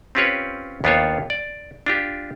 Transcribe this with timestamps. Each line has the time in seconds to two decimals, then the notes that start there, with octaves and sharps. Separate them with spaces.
0.15 C4 C#4 F4 G4 B4 C#5
0.84 D#2 B3 D4 F4 C5 C#5
1.30 D5
1.86 D4 F4 G4